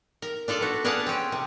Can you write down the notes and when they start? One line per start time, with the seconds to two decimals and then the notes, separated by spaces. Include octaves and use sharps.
0.22 A#4
0.48 D4 F4 A4 D5
0.61 F#4 B4
0.84 D4 G#4 B4 F5 F#5 A5
1.06 C4 C#4
1.32 C3